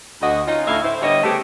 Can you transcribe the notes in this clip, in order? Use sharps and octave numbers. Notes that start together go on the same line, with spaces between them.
D2 F#4 D#5
C#4 D#4 F4
D2 A2 D#4 E4 E5 F5
A2 E4 C5
D3 G3 B3 C#5 D#5
C#3 A3 B3 C4 G4